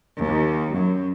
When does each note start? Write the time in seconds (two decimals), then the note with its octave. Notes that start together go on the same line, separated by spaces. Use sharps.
0.24 D#2
0.75 F#2